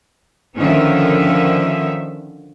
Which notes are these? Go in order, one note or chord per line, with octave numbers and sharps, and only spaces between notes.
D3 D#3 F3 C#4 D#4 E5